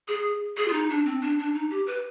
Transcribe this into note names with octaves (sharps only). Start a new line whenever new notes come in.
G#4
G#4
F4
D#4
D4
C4
D4
D4
D#4
G4
B4